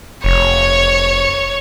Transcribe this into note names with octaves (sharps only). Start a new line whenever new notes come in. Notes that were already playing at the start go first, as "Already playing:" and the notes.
F1 C#5